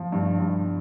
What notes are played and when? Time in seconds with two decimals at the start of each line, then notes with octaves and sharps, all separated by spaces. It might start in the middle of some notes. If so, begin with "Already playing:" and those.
Already playing: F3
0.12 G2
0.39 G2